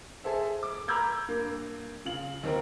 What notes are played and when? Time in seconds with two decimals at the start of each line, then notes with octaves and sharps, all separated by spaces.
0.24 G#4 A4 C5 E5
0.63 D6
0.88 A#5 B5 D6 E6 G6 G#6
1.28 G2 A#3
2.05 C#3 F4 F#7
2.43 D#2 D#3 C4 A#4